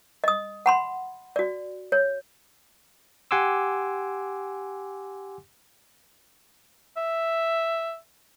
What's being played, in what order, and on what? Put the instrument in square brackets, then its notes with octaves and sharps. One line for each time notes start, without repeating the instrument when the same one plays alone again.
[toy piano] D#5 D#6
F#5 B5 C6
F#4 D5
C#5
[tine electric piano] G4 F#5 G#5 C6 D6 E6
[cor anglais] E5